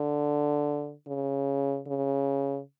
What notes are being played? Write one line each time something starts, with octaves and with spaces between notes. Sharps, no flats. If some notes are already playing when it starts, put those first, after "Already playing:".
Already playing: D3
C#3
C#3